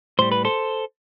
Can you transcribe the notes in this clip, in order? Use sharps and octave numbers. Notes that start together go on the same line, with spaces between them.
A2 G3 C5
B4
A4 C5